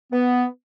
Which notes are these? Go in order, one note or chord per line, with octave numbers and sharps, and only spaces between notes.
B3